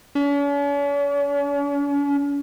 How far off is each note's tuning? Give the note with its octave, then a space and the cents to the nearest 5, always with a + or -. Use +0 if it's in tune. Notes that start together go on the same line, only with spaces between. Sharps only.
C#4 +45